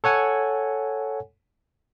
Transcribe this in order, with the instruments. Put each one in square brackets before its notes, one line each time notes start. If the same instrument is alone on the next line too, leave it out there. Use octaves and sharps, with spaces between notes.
[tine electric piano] A4 C#5 F#5 G#5